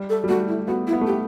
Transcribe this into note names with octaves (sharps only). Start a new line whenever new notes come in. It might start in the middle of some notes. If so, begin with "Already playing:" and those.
Already playing: G3
A4
G3
A3 F#4
E4
B3 F#4
E4
B3
A3
G4
B3